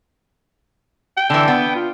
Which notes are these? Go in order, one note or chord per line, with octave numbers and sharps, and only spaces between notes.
G5
D3 E3
B3
F4